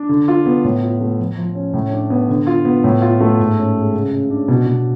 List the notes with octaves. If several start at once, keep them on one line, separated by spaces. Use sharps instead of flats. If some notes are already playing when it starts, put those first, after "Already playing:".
Already playing: D4
D3
F4
B3
A2
F4
A3
F3
F3
C#4
A2
D4
B3
D3
F4
B3
A2
F4
A3
G#2
C#4
G#3
C#3
C#3
D4
B2
B2